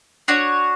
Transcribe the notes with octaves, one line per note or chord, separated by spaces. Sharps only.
D4 F#4 C#5